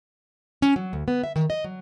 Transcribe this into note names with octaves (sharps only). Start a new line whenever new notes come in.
C#4
F#3
D2
B3
E5
D#3
D#5
F#3